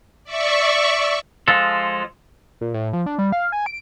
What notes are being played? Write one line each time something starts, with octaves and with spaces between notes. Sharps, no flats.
D5 E5 C#6
F3 G#3 A4
A#2
A2
F3
D4
G3
F5
G#5
D7